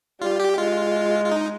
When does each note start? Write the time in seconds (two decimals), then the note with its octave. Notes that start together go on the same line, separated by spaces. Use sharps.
0.21 G3 F4
0.40 G4
0.58 G#3 F4
1.25 F4
1.31 D#4